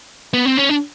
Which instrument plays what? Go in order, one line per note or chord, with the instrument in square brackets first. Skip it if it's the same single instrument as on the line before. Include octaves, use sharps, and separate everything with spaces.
[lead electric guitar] B3
C4
C#4
D4